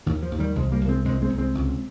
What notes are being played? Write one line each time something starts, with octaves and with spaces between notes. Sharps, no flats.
D#2 D#3
F3
D#2
D#3 G3
C2 F3 G#3
G3 A#3
C2
G#3 C4
C2 G#3 C4
G#3 C4
C2
G#3 C4
C#2